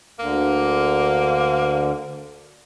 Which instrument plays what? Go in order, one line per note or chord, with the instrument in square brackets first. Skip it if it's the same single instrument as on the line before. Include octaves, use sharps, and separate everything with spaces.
[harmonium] D2 D3 [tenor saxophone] A#3